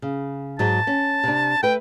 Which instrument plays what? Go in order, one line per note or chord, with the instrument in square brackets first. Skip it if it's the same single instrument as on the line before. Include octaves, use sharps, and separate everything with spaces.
[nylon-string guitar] C#3
[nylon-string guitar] G#2 F#3 G#3 [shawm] A5
[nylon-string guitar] C#4
C3 D4
[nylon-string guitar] A3 B4 [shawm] G5